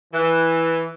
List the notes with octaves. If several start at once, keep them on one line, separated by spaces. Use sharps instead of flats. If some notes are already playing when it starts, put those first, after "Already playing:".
E3